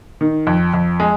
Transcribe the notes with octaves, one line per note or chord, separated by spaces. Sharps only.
D#3
F2
F2
G#3